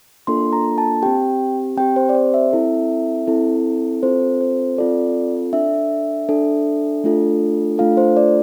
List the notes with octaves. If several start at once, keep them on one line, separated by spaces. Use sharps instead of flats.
A#3 D4 F4 A4 C6
A#5
A5
C4 G4 G5
C4 G4 G5
C5
D5
C5
E5
C4 E4 A4
C4 E4 A4
C4 F4 A4 C5
C5
C4 F4 A4 D5
D4 A4 E5
D4 A4
A3 D4 F4 A4
A3 D4 F4 A4 F5
C5
D5